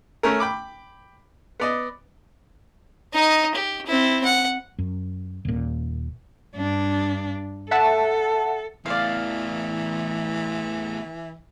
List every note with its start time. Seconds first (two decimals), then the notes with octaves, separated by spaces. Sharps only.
0.23 A3 C#4 A#4
0.40 G5 B5 D6
1.60 B3 D5 D#5
3.14 D#4 D#5
3.55 G4
3.86 C4 E4
4.25 F#5
4.79 F#2
5.45 D#1 A#2
6.56 G2 D4
7.71 A4 E5 F#5 A5
8.86 E2 A2 E3 D5 F5